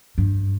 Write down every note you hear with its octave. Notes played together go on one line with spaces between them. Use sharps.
G2